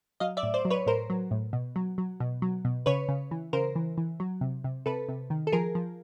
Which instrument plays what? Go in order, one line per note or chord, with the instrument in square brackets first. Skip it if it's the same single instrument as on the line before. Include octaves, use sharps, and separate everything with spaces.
[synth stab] F#3 D#5 F5
D5 E5
A2
C5 D5
F#3
B4 C#5
A2 A#4 C5
F#3
A2
B2
F#3
F#3
B2
F#3
B2
C#3 B4 C#5
C#3
E3
C#3 A#4 C5
E3
E3
F#3
C3
C3
C3 A4 B4
C3
D#3
A4
F3 G#4 A#4
F3